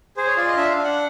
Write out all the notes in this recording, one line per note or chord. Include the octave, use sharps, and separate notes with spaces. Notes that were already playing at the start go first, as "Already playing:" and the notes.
G#4 C5
C#5
F4 D5
D#5
D4 E5
F5
D4
F#5